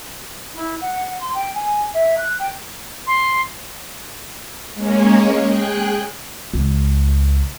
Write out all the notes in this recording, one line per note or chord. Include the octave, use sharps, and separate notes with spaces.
E4
F#5
C6
G5
G#5
E5
F#6
G5
C6
G#3 A#3 C#4 C#5
G#4 G5 F#6
C#2